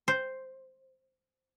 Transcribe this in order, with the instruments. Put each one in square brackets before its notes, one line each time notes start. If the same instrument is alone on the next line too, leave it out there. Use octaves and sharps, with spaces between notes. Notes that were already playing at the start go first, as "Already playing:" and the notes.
[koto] C5